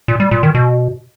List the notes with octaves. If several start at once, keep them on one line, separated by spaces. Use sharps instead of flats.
A#2
G3
A#2
D#3
B2